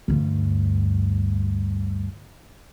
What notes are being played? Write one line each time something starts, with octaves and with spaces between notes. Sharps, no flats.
D2 G2